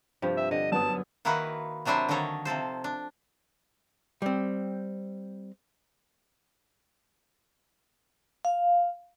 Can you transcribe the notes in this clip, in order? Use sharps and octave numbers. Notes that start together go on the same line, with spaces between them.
G2 C3 F3
E5
D3 D#5
F#2 B3 A5 D#6
D#3 A#3 D#4 E4 F#4 B4
C3 F#3 D4 E4 C5 G#5
D3 D#3 A#3 D#4 A4 C#5
C3 F3 A4 C5
D4
G3 C4
F5